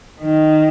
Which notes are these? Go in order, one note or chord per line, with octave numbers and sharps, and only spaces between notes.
D#3